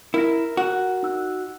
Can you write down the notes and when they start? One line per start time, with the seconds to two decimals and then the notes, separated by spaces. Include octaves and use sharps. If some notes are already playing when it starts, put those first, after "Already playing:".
0.14 E4 A#4 F6 A#6
0.57 F#4
1.03 D#4 E6 F#6